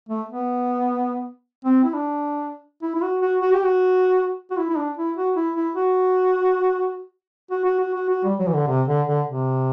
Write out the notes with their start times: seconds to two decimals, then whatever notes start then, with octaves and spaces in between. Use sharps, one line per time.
0.09 A3
0.29 B3
1.65 C4
1.83 E4
1.94 D4
2.82 E4
2.95 E4
3.02 F#4
3.21 F#4
3.41 F#4
3.53 G4
3.65 F#4
4.51 F#4
4.58 E4
4.70 E4
4.77 D4
4.97 E4
5.17 F#4
5.36 E4
5.55 E4
5.75 F#4
7.51 F#4
7.65 F#4
7.80 F#4
7.94 F#4
8.09 F#4
8.24 G3
8.39 F#3
8.47 E3
8.54 D3
8.68 C3
8.88 D3
9.07 D3
9.27 C3